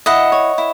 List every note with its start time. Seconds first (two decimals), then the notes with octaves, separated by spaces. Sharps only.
0.06 E4 D#5 F#5
0.32 C#5
0.58 E4